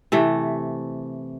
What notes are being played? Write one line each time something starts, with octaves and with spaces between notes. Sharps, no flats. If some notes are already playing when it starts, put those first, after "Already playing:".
C3 E3 A3